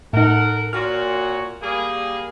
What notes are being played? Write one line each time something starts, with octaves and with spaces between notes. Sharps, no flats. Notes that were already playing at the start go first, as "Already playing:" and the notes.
A2 D#4 A4 A#4 F#5
A#2 F#4 C#5 F6
G3 A#3 G#4